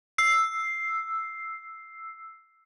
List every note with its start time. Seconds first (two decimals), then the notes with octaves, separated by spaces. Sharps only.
0.18 E6 C7